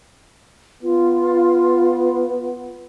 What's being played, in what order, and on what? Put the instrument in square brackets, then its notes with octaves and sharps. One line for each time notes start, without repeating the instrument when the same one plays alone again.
[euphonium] B3 [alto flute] F4